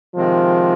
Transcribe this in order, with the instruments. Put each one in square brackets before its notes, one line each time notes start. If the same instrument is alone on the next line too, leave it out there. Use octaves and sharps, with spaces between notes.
[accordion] C3 D#3 G#3 C4 [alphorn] F3